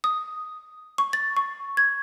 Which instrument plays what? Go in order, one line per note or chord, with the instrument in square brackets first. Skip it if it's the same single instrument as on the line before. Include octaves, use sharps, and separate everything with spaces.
[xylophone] D#6
C#6
A6
C#6
G#6